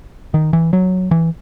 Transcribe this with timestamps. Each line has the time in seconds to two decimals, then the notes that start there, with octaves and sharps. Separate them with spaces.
0.34 D#3
0.53 E3
0.73 F#3
1.11 E3